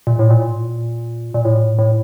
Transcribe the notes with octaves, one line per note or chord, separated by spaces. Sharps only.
A#2
A2
A#2
A#2
A2
A2